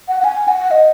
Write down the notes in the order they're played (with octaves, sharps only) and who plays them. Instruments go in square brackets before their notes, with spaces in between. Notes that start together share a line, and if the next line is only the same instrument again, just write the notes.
[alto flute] F#5
F#5
G#5
F#5
D#5